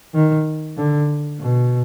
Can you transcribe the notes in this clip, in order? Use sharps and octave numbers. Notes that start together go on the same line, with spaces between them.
D#3
D3
B2